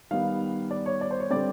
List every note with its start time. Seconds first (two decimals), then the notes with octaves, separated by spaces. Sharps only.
0.11 D#3 G3 B3 F5
0.71 D5
0.86 C#5
1.01 D5
1.11 C5
1.20 C#5
1.30 D3 G3 C4 D5